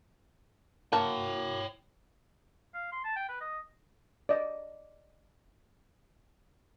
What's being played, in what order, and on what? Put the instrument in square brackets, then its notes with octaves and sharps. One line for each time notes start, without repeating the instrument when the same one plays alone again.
[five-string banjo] A#3 F#4 A5 [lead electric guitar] C#5 G5
[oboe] F5
C6
A5
G5
B4
D#5
[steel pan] D5 D#5